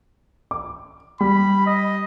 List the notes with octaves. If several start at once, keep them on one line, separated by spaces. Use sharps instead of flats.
D6
G3 B5
D#5